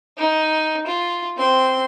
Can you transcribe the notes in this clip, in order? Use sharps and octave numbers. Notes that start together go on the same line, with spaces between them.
D#4
F4
C4 C6